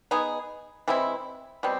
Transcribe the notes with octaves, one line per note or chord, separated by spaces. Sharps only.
B3 D#4 G#4
E3 G#3 C4 E4
B2 G3 C4